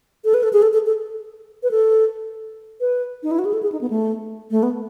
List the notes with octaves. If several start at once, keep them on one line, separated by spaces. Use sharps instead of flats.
A4
B4
A4
G#4
A4
A4
A4
B4
A4
B4
D#4
E4
F#4
G#4
A4
G#4
D#4
B3
A3
A3
B3